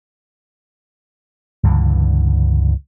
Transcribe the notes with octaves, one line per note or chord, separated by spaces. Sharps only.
C#2 G2 D3 E3